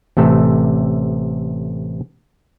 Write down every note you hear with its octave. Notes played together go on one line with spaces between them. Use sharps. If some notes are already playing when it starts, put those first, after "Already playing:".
A1 C3 A3 A4